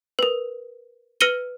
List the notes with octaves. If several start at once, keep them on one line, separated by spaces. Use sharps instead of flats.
A#4 B4
B4 F6 A#6 C#7 D#7 G7